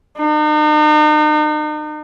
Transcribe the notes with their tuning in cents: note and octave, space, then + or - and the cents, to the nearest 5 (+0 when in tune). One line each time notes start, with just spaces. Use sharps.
D#4 -40